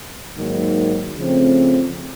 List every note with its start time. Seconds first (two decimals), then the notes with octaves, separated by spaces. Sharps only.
0.37 G#2 D#3 F#3 A#3
1.18 C#3 F3 A3 C4